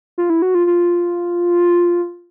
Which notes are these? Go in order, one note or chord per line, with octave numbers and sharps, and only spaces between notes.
F4
E4
F#4
F4
F4